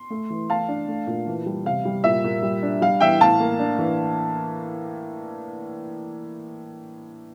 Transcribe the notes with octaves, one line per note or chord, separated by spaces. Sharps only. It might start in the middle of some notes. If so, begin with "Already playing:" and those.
Already playing: C6
A3
E3
A3 F5 A5
D4
A3
A#2
E3
G3
C3 F5
G3
A#2 E5
A#2
G3
D4
G3 F5
E3 E5 G5
A2 F5 A5
A#3
D4
E3